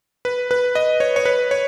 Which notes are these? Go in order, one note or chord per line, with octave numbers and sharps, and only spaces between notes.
B4
B4
D#5
C#5
C#5
B4
C#5